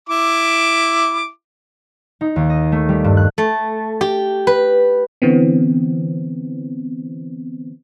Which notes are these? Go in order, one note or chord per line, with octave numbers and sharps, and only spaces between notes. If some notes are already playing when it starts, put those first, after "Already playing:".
E4 D6
D#4
D#2
D#5
A3
G3
G2
F#6
A3
G4
B4
D3 E3 B3 C4